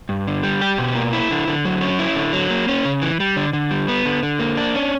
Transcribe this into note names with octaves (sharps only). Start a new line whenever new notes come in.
G2
D3
G3
G4
B2
A#3
E4
D3
D3
F#3
C#4
E4
D3
F#3
A#3
C#4
C#3
E3
G3
D3
D3
G3
B3
D3
D3
A#3
D4
C#4